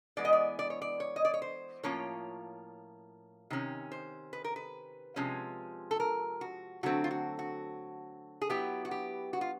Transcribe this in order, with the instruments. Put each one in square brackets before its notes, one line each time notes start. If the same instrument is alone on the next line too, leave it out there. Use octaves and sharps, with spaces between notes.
[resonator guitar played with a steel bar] E3 G#3 B3 D5
D#5
D5
D5
C#5
D5
C#5
D#5
D5
C#5
C5
A2 F3 A#3 C#4 F4 C#5
C3 D#3 C#4
C5
B4
A#4
B4
C3 F3 G#3 C#4
A4
A#4
F#4
D3 F#3 A3 C4 F#4
F4
F#4
F#4
G#4
F#3 B3 E4 G4
F#4
G4
F#4
F4